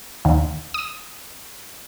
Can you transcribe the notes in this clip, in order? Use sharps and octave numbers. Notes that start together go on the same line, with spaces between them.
D#2
D#6